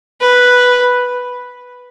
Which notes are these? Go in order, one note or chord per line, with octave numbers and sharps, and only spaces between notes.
B4